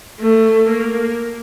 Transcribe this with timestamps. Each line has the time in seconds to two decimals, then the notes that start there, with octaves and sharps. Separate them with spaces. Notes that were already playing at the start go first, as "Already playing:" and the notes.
0.20 A3
0.70 A#3